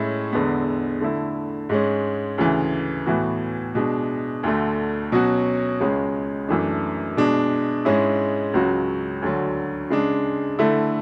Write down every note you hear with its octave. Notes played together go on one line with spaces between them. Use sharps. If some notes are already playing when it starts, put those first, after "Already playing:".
Already playing: A2 G#3 C#4 E4
E2 D3 G#3 B3
D3 A3 E4
G#2 G#3 C#4
D2 C#3 E3
A2 E3 B3 F#4
B2 G#3 D4
D2 D3 A3
B2 F#3 C#4 F#4
C#2 C#3 G#3 C#4
F#2 E3 A3 D4
B2 G#3 D4
G#2 G#3 C#4 E4
C#2 C#3 F#3 C#4 F#4
D2 D3 F#3
C#3 G#3 D4
D3 A3 E4